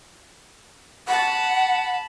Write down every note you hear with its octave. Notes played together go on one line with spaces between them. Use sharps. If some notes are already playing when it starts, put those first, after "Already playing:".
F#5 A5 B5